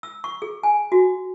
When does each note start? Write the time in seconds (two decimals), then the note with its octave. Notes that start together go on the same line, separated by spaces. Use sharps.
0.03 E6
0.24 C#6
0.42 G#4
0.63 G#5
0.92 F#4